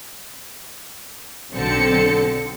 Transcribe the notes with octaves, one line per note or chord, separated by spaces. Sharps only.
B1 D3 C4 A4 C#7